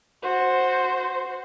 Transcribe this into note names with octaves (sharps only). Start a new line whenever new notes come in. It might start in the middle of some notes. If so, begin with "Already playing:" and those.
F#4 C5